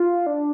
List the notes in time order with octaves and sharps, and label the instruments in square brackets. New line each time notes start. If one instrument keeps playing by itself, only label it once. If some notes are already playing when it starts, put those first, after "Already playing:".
Already playing: [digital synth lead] F4
D4